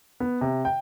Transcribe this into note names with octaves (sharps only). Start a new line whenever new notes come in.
B3
C3
G5